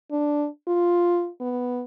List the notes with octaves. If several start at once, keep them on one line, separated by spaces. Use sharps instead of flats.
D4
F4
B3